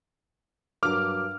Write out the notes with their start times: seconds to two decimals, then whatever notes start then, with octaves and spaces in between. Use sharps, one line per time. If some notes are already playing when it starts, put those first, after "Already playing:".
0.83 G2 F#3 A#4 D6 F6